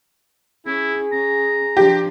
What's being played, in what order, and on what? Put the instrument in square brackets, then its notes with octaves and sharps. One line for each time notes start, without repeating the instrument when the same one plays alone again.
[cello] C#4 [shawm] E4 [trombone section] G#4
[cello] C#4 [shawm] A#5
[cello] F3 D4 [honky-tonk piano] G4